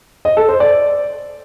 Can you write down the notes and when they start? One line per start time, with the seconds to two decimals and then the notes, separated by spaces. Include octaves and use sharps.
0.25 D#5
0.37 A4
0.49 C5
0.60 D5